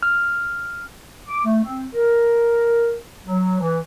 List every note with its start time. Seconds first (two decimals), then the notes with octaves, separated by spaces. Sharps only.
0.03 F6
1.29 D6
1.45 A3
1.64 C4
1.94 A#4
3.27 F#3
3.60 E3